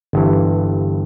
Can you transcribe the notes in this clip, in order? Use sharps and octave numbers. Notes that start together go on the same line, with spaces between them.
G1 G2 E3